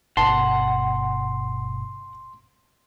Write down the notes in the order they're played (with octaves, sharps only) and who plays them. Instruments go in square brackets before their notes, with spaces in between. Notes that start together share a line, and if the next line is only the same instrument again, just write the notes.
[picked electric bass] G1 B2 [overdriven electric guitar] F#5 [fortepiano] A5 [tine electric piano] C6